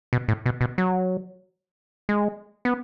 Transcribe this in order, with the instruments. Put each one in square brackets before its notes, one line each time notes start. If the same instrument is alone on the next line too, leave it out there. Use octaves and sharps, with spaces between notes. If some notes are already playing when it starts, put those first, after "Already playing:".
[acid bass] B2
A2
B2
B2
F#3
G#3
B3